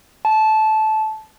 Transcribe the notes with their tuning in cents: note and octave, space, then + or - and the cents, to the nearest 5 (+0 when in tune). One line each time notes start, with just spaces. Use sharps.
A5 -15